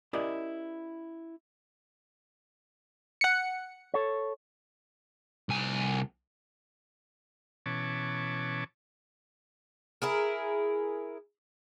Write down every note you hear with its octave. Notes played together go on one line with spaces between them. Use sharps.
C#4 E4 G4 A#4 D5 D#5
F#5 C#7
A4 C#5
C2 G#5
B2 E3 C#4 C#5 A5 D6
E4 G#4 A#4